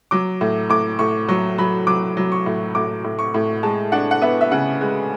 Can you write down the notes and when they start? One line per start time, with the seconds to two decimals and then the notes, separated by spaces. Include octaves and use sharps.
0.11 F#3 D6
0.41 A2
0.69 A2 D6
0.99 A2 C#6
1.28 F#3 C#6
1.58 F#3 B5
1.87 F#3 D6
2.17 F#3
2.32 C#6
2.46 A2
2.75 A2 D6
3.04 A2
3.19 C#6
3.34 A2
3.63 G#3 A5
3.92 D4 F#5
4.11 F#5
4.22 B3 E5
4.41 E5
4.51 C#3 F#5
4.81 G#3